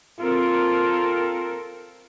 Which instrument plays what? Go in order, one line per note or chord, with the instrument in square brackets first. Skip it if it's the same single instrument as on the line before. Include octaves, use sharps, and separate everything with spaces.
[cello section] C4 A4 A#4 [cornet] F4